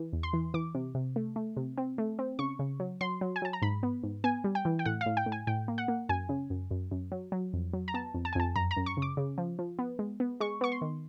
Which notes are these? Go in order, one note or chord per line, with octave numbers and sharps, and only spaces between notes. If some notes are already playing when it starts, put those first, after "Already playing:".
Already playing: E3
E2
C6
E3
E3 D6
C3
C3
A3
A3
C3
C4
A3
C4
C#3 C#6
C#3
F#3
F#3 C6
F#3
G#5
F#3 A5
A#5
G#2 B5
B3
G#2
B3 G#5
G3
G5
E3
G5
A2 F#5
F5
A2
G5
A2
G#5
A2 G5
A#3
F#5
A#3
F#2 G#5
C#3
F#2
F#2
F#2
F#3
F#3
F2
F#3
A#5
B3 A5
F2
A5
G#5
F2 A5
F#2 A#5
A#5
F#2
C#6
C#3
D6
C#3
F3
F3
B3
G#3
B3
G#3 C#6
B3 C#6
C6
D#3